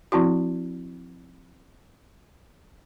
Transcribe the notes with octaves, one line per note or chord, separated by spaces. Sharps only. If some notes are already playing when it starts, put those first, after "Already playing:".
F3 C4 E4 F#4